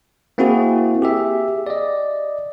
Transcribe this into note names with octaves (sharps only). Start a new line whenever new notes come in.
A#3 C4 E4 F#4 G#4
G4 G#4 E5
D5 D#5